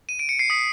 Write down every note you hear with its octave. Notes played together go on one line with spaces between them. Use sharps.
D#7
D7
C#7
C7
D#6 B6